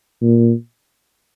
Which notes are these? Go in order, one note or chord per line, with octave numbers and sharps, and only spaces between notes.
A#2